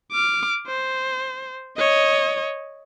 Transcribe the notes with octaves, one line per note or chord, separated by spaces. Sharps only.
D6 F6
C5
C#5 D#5